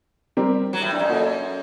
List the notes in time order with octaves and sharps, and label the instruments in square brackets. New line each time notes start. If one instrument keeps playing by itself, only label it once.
[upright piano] G3 C4 G4 A#4
[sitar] F#3
A2
G2
F#2
[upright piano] A#3 F#4 A4 D#5